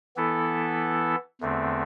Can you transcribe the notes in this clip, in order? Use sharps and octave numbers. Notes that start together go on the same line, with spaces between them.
E3 B3 E4 A4
E2 D3 A3 C4